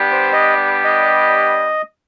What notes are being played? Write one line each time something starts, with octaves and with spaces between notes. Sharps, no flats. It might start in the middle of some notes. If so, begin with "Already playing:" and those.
Already playing: G3 B3 D4 G4
C5
D#5
D#5